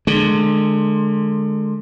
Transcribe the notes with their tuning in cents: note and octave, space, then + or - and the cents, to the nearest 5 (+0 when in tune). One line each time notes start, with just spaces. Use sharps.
D3 +30 G#3 +25